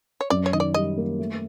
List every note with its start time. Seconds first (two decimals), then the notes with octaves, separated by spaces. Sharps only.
0.21 C#5
0.30 F#2 D5
0.46 C#5
0.53 D#3 D#5
0.60 D5
0.74 G3 D#5
0.97 A#3
1.18 A3